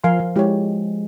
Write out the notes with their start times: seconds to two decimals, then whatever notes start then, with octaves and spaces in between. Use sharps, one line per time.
0.04 F3 A#4 F5 G#5 C6
0.19 F3
0.36 G#3 E4 G4 C#5